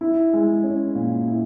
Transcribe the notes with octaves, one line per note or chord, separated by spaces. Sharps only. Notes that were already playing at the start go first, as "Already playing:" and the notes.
E4
G#3
C#4
A#2
E4